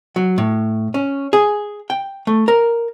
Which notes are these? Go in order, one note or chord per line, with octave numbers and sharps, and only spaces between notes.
F#3
A2
C#4
G#4
G5
A3
A#4